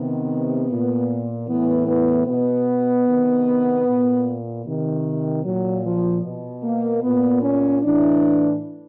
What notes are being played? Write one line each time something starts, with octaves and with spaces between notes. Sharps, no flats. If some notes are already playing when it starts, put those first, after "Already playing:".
Already playing: C3 D#3 B3
A#2
A2 E3 B3
B3
B2 B3
C3 D#3
A#2
C3 D#3
A#2 F#3
F3
B2
A#3
A#2 B3
C#4
A2 E3 D4